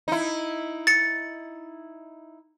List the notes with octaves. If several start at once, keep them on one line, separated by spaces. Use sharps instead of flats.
D#4 E4
A6 C#7